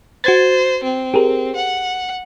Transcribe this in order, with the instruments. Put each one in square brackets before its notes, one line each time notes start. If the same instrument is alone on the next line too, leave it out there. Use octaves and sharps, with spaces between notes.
[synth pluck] F#4 G#6 A6 [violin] C5
[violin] C4
[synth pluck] G4 G#4 A#4
[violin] F#5